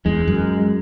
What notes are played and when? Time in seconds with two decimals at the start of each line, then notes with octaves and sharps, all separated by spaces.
0.06 E2 G#3
0.28 F#2